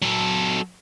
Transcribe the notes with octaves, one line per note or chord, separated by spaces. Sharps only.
F#3 A4